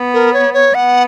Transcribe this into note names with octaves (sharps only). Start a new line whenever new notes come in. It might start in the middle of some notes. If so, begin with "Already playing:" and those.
Already playing: B3
A#4
C#5
C#5
B3 F#5